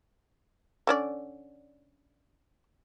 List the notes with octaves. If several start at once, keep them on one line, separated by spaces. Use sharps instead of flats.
D3 C#4 D5